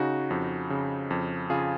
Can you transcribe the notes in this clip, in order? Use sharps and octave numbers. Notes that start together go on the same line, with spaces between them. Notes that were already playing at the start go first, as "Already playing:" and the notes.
Already playing: C#3 D#4 F#4
F2
C#3
F2
C#3 F4 G#4